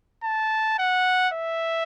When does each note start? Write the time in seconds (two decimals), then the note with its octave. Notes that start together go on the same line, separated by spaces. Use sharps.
0.24 A5
0.79 F#5
1.34 E5